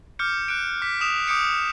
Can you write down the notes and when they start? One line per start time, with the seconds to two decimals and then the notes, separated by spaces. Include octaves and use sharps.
0.19 D6 F6 G6 C#7
0.48 F#6 D7
0.82 D6 B6
1.01 D#6 E7 F7
1.27 D6 D#6 G6 C#7 D7